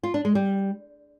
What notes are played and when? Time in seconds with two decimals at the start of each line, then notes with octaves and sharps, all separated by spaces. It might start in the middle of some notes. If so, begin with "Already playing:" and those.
0.03 F4
0.14 D4
0.25 G#3
0.35 G3